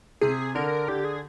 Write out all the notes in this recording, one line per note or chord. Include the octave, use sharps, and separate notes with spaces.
C3 G#4
D3 A#4
D3 G4
G#4